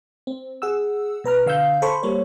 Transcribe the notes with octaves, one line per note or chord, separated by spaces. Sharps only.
C4
G#4 F#5 E6
B2 B4 A#5 F6
D3 F5 E6 G6
A4 C5 B5 C#6
G3 A#3 C#5